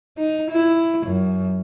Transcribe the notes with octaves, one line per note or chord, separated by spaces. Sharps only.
D#4
E4
F#2